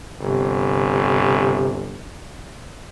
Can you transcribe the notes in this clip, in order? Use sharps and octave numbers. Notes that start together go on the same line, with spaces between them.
G1 C3